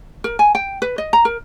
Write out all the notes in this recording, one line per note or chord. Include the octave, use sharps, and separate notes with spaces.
A#4
G#5
G5
B4
D#5
A#5
A#4